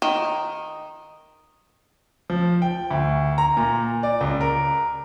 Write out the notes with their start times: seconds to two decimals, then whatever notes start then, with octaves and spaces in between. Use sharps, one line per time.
0.02 D#3
2.30 F3
2.62 G5
2.91 D2
3.38 A#5
3.57 A#2
4.03 D5
4.21 C#2
4.41 A#4